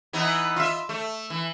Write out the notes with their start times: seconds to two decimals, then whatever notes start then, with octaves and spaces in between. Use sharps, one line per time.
0.13 E3 B3 D#4
0.56 F4 E5
0.89 A3
1.30 E3